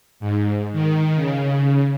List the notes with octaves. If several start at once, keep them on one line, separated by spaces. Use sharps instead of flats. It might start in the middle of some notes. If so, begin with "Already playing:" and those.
G#2
D#3
C#3